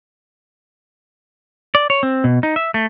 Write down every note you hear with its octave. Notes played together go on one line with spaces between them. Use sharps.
D5
C#5
C4
B2
D#4
E5
A3